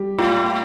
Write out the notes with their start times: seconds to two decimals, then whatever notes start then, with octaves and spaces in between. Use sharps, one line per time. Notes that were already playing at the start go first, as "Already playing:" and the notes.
Already playing: G3 G4
0.18 A2 F4